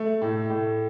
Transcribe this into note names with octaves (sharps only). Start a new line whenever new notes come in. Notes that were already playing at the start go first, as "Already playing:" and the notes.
Already playing: A3
A2
A2